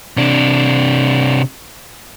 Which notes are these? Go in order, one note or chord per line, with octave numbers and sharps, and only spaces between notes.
C3 D4